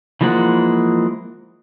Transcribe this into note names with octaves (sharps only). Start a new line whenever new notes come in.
E3 F3 G#3 A#3 F#5